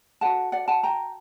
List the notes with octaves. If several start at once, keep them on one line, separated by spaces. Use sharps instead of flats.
F#4 A4 F#5 A5
D5 F#5
F#5 A5
G5 A#5